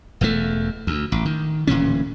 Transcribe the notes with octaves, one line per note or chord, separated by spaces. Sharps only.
E1 E2 C#3 A3
D2
A1
D#3
D1 A#2 E3 C#4